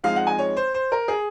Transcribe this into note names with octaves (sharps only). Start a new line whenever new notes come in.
F3 G#3 C4 D#4 F5
F#5
G#5
C#5
C5
C5
A#4
G#4